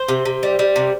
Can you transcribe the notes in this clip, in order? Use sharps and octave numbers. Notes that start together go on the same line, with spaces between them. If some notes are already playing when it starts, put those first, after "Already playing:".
Already playing: C5
C3
C3
G3
G3
C3